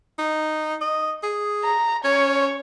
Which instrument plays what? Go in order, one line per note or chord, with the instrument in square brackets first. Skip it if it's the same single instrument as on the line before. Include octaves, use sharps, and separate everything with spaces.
[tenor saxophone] D#4
D#5
G#4
[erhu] A#5
[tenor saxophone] C#4 [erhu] C#5